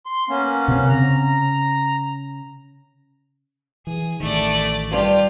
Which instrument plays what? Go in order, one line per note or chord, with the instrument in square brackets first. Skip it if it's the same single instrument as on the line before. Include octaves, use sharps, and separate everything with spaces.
[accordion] C6
A#3 B3 C#4
[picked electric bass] C3 C4
[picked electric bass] C#3 [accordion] A#5
[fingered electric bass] E3 [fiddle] G#4
[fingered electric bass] A1 D#3 [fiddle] A3 D5
[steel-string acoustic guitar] G2 [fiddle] F4 G4